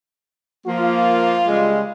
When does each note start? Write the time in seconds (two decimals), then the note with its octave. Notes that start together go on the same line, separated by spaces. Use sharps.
0.67 F3 A#3 F4
1.48 C#3 G3 G#3